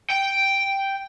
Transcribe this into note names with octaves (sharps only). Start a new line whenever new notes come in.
G5